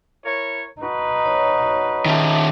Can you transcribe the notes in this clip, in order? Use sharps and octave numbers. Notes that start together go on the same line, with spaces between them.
E4 A#4 C#5
D#4 F#4 B4
C#5
D#3 C#4 E5 A5 D6